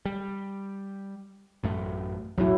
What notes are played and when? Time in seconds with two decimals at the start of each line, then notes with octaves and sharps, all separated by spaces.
0.05 G3
1.63 A1 F#2 A3
2.38 B1 E2 A2 F#3 E4